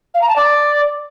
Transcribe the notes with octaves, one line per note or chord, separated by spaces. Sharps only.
F5
A#5
A5
D5